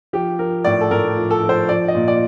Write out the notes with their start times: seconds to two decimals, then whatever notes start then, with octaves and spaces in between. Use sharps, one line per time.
0.13 F3 G4
0.39 F3 A#4
0.65 A2 D5
0.81 A4
0.91 A2 A#4
1.17 F3
1.31 A4
1.43 F3
1.49 C5
1.69 F3 D5
1.88 D#5
1.95 A#2
2.08 D5